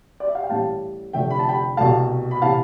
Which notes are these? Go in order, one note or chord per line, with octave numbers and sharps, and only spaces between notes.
D5
E5
F5
G5
A1 A2 G3 F5 A5
F1 F2 D3 A3 E5 G5
B5
A5
G5 B5
C2 B2 A3 F5 A5
B5
C3 E3 F5 A5